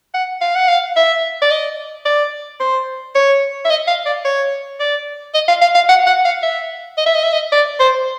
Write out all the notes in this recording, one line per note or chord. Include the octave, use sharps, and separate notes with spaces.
F#5
F5
F#5
F5
E5
D5
D#5
D5
C5
C#5
E5
D#5
F5
D5
C#5
D5
D#5
F5
F5
F5
F#5
F#5
F5
E5
D#5
E5
D#5
E5
D#5
D5
C5